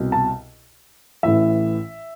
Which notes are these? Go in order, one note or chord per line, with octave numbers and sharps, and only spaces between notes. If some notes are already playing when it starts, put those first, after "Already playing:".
Already playing: C2 B2
A5
A1 A2 E3 E5